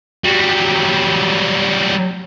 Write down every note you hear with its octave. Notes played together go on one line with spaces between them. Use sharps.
F#3 G3